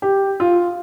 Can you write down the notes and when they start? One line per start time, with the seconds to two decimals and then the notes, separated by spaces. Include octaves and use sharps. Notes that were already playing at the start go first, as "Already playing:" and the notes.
0.02 G4
0.40 F4